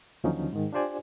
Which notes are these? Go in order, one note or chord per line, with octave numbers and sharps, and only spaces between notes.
D#2 D3 F3 F#3 C#4 D#4
G#2 D#3
D4 F4 G4 C5 D5 G#5